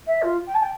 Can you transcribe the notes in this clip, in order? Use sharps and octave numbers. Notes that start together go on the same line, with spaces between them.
E5
F4
G5
A5
G5